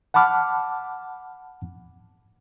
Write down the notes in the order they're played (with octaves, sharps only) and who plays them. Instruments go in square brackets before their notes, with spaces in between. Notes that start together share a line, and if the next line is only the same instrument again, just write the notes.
[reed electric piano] F#5 A5 B5 D6 F6